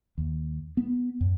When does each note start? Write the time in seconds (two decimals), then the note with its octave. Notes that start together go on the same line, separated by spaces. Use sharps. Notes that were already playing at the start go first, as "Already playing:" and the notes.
0.18 D#2
0.77 B3
1.21 F#2